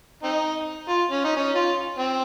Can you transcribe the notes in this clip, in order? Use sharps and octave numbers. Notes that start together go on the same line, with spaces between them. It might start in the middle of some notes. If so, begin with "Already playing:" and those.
C4 D#4
F4
C#4
D#4
C#4
F4
C4